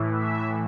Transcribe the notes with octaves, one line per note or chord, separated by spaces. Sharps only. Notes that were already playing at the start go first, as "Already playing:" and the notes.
Already playing: A2 E3
E5